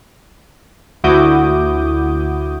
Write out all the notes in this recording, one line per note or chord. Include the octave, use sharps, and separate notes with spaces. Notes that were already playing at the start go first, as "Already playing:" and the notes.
D2 E4 F#4 D6 D#6 G6